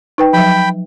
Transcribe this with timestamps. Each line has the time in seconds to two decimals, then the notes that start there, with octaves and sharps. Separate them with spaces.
0.18 D#4 B4 G5
0.33 F3 F#3 G5 B5